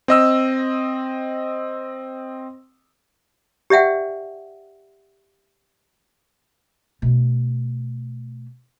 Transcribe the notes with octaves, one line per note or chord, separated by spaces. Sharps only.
C4 D#5 E6
G4 D5 E5 F#5 G5
B2 A3